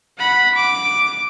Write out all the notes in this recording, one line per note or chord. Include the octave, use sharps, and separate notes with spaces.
F#5 B5
D6